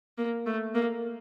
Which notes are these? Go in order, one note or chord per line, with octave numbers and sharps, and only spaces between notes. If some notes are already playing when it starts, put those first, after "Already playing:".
A#3
A3
A#3